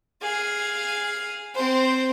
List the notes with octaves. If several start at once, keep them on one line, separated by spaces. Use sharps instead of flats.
G#4 F5
C4 C5